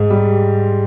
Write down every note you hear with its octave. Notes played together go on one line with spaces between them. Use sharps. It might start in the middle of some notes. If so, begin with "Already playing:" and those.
Already playing: G#2 G#3
G3